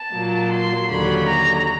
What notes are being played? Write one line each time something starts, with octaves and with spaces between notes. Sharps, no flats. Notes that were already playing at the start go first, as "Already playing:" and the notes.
Already playing: A5
A#2 F#3 A#3
C6
D#2 D3 F#3 B5
A#5